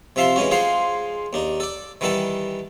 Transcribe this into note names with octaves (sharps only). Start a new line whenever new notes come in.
C3 F3 E5 F5 A5 C6
E3 G#3 C#4 F#4
G#3 F4 G#4 C5 F5 F#5
D#2 D4 D#4
A4 D5
D#3 E3 G3 A4 F#5 A5